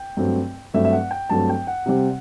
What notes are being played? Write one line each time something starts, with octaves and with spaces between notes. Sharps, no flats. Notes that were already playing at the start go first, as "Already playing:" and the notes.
Already playing: G5
G2 F#3 A3 C4
G2 F#3 A3 C4 E5
E5
F#5
G5
G2 F#3 A3 C4 A5
G5
F#5
C3 G3 C4